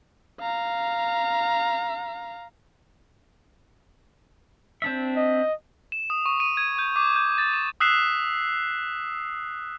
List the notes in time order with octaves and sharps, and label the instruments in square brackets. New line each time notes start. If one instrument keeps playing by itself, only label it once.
[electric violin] F5 A#5
[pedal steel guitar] C4 D4 E5
[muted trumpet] D#5
[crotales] E7
D#6
C#6
D#7
G#6
G6
D6
G6
A6
E7
D#6 E6 F#6 B6 C7 E7